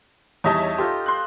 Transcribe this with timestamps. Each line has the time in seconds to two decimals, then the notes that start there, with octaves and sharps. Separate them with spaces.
0.44 E2 G3 D#4 C#5 D#5 E5 A5
0.78 F4 G4 A4 C5
1.06 C6 F#6